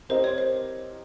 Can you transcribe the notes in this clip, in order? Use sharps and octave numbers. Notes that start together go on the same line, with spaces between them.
C4 G4 A#4 C5 D#5
C#5
C5